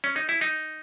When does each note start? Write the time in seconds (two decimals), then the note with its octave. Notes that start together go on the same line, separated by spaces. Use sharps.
0.04 C#4
0.16 D#4
0.29 E4
0.41 D#4